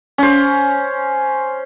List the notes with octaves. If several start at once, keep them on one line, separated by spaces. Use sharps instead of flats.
C#4 C5